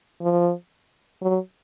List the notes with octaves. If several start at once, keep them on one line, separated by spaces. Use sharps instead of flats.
F3
F#3